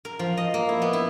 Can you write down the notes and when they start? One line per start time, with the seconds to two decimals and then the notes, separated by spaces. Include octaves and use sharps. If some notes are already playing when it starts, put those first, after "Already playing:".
0.05 A#4
0.19 F3
0.37 D#5
0.54 A#3
0.69 E4
0.82 B3
0.93 E4